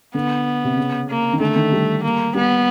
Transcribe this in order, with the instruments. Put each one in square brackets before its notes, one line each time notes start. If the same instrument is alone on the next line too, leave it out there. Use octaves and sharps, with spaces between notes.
[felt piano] D3 [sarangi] B3
[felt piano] C3
C#3
[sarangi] A#3
[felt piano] D#3
[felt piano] D3 [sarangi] A3
[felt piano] D#3
G3
[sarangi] A#3
[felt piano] G3 [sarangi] B3